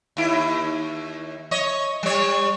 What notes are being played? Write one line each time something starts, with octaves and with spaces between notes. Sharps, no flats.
D#2 E4
C#5 D#5
G3 C#5